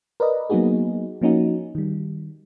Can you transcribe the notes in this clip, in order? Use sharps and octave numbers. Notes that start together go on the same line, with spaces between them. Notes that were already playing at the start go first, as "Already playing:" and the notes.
A#4 B4 D5 D#5
F#3 A#3 B3 D#4 F#4 G#4
F3 A#3 C#4 D#4 F#4
D#3 G3